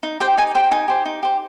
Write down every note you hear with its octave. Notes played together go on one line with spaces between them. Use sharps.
D#4
G4 C5 G5
D#4 G#5
G4 C5 G5
D#4 G#5
G4 C5
D#4
G4 C5